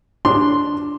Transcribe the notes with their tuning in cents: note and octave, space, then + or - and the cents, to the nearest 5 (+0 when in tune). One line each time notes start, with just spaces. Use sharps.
D4 +0 C6 +0